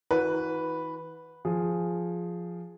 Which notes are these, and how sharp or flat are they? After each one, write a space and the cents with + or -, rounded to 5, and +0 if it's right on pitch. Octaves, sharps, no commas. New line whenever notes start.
E3 -40 F#4 -20 B4 +0
F3 +0 G#4 +0